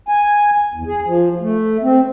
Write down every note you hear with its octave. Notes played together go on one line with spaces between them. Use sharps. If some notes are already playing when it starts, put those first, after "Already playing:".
G#5
E2
G#4
F3
A3
C4